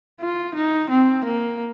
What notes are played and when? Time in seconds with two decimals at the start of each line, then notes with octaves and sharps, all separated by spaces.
0.21 F4
0.55 D#4
0.90 C4
1.25 A#3